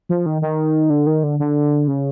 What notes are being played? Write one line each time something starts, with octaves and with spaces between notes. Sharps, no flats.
F3
D#3
D#3
D3
D#3
D3
D3
C#3